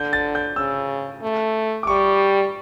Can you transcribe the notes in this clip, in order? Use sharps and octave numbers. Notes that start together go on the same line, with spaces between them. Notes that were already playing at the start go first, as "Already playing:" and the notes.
Already playing: D3 G6
A6
G6
C#3 E6
A3
D6
G3 C#6